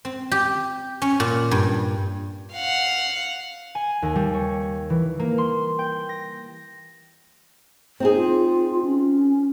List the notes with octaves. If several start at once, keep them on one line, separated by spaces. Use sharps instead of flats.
C4
G4
C#4
A#2
G2
F5 F#5
G#5
D#2
G3
C#5
E3
A#3
C6
G5
A#6
C4 D#4 G#4
F4
C#4